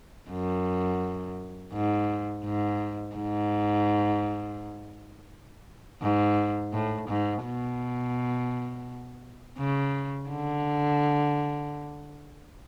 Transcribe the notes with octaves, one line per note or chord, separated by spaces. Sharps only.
F#2
G#2
G#2
G#2
G#2
A2
G#2
B2
C#3
D3